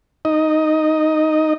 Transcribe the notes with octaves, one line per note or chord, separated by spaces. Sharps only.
D#4 D#5